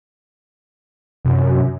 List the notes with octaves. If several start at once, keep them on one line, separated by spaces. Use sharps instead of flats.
F#2 C3